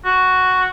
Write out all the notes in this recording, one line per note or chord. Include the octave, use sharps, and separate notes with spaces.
F#4